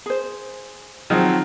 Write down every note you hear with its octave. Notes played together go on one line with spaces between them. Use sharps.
G#4 C5
D#3 F3 F#3 C4 G#4